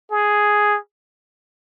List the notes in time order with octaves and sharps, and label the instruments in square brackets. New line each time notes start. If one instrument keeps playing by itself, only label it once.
[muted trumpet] G#4